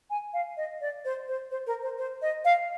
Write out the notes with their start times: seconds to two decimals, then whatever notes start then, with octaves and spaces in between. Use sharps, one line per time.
0.10 G#5
0.33 F5
0.57 D#5
0.81 D5
1.05 C5
1.28 C5
1.51 C5
1.67 A#4
1.82 C5
1.98 C5
2.22 D#5
2.45 F5